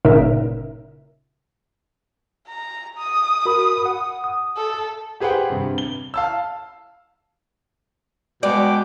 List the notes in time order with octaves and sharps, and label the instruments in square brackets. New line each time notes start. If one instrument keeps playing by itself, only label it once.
[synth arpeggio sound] G1 A#2 C#3 D#4 A#4 E5
[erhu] A#5
D#6
[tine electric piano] F#4 A#4 B5
F#5
D#6
[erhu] A4
[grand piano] G4 G#4 B4 C5 F#5 G5
G2 C3
G7
F5 A5 E6
[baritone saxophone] B2 [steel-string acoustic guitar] G#3 [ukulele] D5 [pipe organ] G5 D6